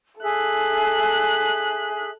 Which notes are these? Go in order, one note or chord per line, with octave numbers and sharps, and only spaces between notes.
G#4 A4 E5 F#6